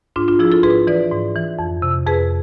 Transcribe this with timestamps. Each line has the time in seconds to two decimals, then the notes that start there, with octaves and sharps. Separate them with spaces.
0.16 G#2 D4 F4
0.28 D4 F4
0.39 F3 E4 G#4
0.52 F4 A4
0.63 G#2 G#4 B4
0.87 E3 B4 D5
1.11 G#2
1.36 E3
1.59 F2
1.82 C3
2.06 F2 G#4 B4